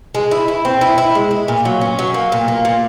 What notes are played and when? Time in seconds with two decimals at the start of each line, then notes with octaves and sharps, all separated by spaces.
0.15 G#3
0.31 E4
0.48 E4
0.65 C4
0.81 E4
0.98 E4
1.15 G#3
1.31 E4
1.48 A#2
1.65 F#3
1.81 C#4
1.99 F#3
2.14 A#3
2.32 A#2
2.48 A#3
2.65 A#2